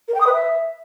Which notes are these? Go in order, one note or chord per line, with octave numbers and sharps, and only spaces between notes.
A#4
G5
D#6
B4
E5